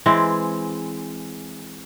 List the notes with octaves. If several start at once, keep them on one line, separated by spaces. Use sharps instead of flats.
E3 G#3 C4